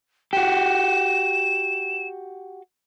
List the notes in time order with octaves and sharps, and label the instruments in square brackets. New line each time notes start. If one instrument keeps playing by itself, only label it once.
[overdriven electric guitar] F#4 G4 [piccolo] E7